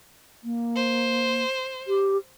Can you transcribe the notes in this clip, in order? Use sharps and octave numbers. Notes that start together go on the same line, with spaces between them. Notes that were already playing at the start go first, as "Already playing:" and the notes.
A#3
C5
G4